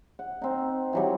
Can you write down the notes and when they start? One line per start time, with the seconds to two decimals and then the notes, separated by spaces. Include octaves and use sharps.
0.19 F#5
0.41 C4 D#4
0.93 E3 F#3 G3